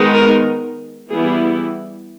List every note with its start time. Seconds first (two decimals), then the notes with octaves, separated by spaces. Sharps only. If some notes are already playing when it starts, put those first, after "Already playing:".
Already playing: D#3 G#3 B3 D#4
0.15 A#4
1.12 E3 G3 B3 E4 G#4